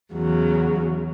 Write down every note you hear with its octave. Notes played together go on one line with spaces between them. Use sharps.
E2 C#3 F#3